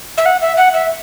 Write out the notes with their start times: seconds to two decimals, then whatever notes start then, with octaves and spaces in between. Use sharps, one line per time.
0.18 E5
0.26 F#5
0.42 E5
0.58 F#5
0.74 E5